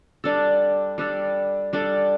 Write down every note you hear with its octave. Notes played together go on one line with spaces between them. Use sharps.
G3 D4 A4
G3 D4 A4
G3 D4 A4